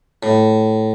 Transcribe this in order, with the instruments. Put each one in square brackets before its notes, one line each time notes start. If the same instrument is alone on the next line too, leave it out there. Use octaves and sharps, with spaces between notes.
[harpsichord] A2